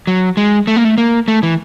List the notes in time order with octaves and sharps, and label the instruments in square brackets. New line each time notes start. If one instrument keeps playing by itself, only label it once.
[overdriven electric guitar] F#3
G#3
A3
A#3
A3
A#3
A3
E3